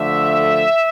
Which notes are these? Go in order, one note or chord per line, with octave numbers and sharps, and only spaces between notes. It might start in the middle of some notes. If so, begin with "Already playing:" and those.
Already playing: D3 F3 A3 E5